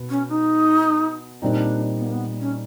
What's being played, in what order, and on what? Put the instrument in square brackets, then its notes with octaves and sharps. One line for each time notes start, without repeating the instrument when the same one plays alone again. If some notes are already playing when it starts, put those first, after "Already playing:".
Already playing: [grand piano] B2 B3
[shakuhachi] C#4
D#4
[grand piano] A#2 G3 C4 D#4 [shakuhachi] D4
[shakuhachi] B3
A#3
B3
C#4